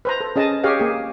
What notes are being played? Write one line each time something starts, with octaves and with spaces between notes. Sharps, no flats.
B4 C5 A#5
A4
C#4 G#4 D#5 A5
G4 G#4 C#5 D#5 F5
A#3 G#4